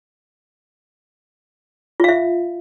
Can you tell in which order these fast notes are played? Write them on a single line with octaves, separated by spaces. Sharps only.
F4 F5 E5